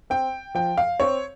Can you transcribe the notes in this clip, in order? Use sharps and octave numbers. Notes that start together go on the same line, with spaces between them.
C4 G5
F3 G5
F5
C4 C#5